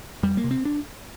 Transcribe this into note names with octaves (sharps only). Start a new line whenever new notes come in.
F2 G3
A#3
C3
C4
D4